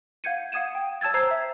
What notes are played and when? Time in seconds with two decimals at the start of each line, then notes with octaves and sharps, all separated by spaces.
0.24 F5 F#5 G6 G#6 C#7 D#7
0.52 F5 F#5 D#6 G#6 D#7 E7
0.75 G5
1.01 C#5 A5 E6 G#6 A6
1.14 C5 A#5 E6 G#6 C7
1.31 E5